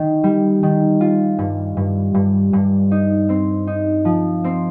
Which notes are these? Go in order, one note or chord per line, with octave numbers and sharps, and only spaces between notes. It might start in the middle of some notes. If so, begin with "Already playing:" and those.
Already playing: D#3
G3
D#3
F4
G2
G2
G2
G2
D#4
C4
D#4
F3
C4